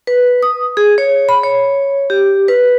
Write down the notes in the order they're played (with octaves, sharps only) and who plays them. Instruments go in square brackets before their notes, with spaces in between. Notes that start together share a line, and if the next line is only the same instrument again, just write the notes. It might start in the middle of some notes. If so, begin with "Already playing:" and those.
[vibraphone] B4
D#6
G#4
C#5
B5
C#5
G4
B4